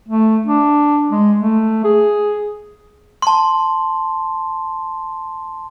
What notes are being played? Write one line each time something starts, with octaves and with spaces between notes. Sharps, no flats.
A3
D4
G#3
A3
G#4
A5 C6